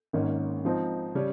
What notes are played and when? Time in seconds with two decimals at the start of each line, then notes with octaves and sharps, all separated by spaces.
0.13 G#1 G#2 D#3 A#3 C#4
0.64 G#2 F3 C4 D#4
1.15 C#3 G3 C#4